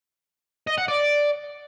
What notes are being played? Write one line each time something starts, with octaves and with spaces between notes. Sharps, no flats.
D#5
F#5
D5